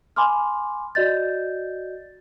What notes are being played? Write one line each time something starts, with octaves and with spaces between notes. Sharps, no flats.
G#5 B5 C6 D6 F6
F#4 D5 D#5 G6 A6